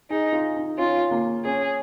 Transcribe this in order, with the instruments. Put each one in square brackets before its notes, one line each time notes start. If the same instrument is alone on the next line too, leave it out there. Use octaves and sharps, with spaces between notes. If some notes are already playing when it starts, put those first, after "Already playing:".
[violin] D#4 [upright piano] G#4
[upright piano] F4
D#4
[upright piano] C#4 [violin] F4
[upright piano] A#3
[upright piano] C#4 [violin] G#4